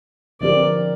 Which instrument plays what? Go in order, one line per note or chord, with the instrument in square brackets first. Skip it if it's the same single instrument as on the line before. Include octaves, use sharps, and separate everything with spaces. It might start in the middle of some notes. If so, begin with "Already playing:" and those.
[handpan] D3 F3 C4 G4 A#4 [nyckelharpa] D5